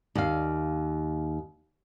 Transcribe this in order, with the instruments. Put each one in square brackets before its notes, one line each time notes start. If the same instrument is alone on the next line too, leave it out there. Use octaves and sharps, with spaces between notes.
[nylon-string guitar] D#2 F5